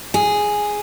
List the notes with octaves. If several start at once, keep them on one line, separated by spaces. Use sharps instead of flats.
G#4